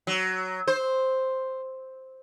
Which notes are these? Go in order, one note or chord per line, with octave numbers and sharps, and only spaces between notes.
F#3
C5